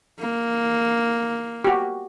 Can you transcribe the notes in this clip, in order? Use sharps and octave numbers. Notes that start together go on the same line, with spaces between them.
A#3
F#4 G4